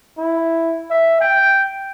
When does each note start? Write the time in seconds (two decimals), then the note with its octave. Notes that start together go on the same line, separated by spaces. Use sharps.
0.18 E4
0.91 E5
1.21 G5